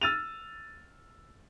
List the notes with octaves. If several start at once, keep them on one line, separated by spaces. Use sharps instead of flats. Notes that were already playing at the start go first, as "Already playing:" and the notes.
E6 F6 A6 D#7 F7